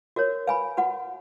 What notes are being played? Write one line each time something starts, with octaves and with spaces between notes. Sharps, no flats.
F#4 A#4 C#5
B4 F5 G#5 B5
F#4 B4 F#5